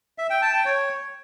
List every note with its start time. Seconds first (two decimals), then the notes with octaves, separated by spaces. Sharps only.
0.18 E5
0.30 G5
0.42 A5
0.54 G5
0.65 C#5